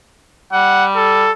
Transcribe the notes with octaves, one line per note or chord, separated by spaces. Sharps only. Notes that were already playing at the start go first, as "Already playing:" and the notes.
G3 F#5
A4